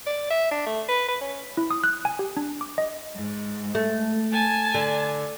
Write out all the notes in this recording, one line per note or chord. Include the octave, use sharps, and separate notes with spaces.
D5
E5
D4
A3
B4
B4
C#4
E4
D#6
F#6
G#5
G4
D4
D6
D#5
G#2
A3
G#5 A5
D3